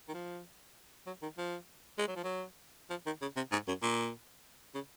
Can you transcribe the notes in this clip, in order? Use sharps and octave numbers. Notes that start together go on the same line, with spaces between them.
D#3
F3
F#3
D#3
F3
G#3
F#3
F3
F#3
F3
D#3
C#3
C3
G#2
F#2
A#2
C#3